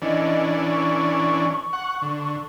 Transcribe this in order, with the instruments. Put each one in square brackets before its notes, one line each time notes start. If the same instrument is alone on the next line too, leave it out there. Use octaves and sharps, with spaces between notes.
[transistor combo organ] E3 C#4 D4 [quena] D#5
[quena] C#6
[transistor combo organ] F#5
D3